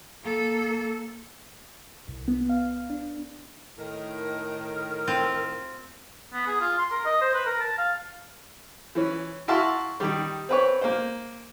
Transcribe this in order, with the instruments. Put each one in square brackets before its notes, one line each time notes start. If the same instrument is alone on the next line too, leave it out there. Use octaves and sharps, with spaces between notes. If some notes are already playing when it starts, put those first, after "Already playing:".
[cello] A#3 A4
[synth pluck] C2
B3
F5
D4
[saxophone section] A2 A#4 [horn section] D#3
[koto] C4 F4
[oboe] B3
G#4
F4
C6
A#4
D#5
C5
B4
A#4
A5
F5
[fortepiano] E3 C#4
E4 F#4 E5 F5 A5 C6
D#3 G3
C4 B4 C#5
A#3 C5